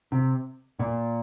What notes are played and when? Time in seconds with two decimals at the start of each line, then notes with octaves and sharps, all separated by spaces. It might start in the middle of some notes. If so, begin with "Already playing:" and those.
0.12 C3
0.79 A#2